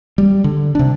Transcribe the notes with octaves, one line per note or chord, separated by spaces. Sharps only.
G3
D3
C3 D4